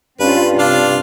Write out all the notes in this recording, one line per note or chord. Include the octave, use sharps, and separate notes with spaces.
G2 C4 C#4 F4 B4
C3 D4 F4 F5